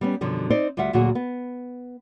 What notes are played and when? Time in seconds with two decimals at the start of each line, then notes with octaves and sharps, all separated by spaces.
0.01 G3 B3 C#4
0.21 F#2 B2 D3 F3 G3
0.50 C4 D#4 C5 D5
0.77 D2 G3 F4 E5 F#5
0.93 D2 A#2 F#3 F#4 G#4
1.15 B3